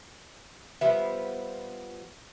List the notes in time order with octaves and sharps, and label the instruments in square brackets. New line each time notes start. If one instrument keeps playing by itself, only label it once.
[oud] F3 G3 B3 [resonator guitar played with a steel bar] E5